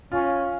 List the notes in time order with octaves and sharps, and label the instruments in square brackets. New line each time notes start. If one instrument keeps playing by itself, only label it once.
[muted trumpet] C#4 [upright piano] F4